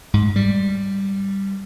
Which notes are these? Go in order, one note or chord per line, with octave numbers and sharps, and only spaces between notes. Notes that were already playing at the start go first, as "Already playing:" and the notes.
G#2
G3